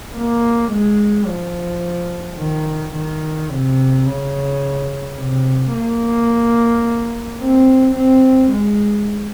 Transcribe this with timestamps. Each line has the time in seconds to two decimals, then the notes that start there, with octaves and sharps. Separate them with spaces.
0.15 A#3
0.72 G#3
1.27 F3
2.38 D#3
2.94 D#3
3.50 C3
4.06 C#3
5.16 C3
5.73 A#3
7.40 C4
7.95 C4
8.51 G#3